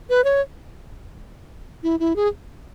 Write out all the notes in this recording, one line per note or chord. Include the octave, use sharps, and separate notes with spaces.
B4
C#5
E4
E4
G#4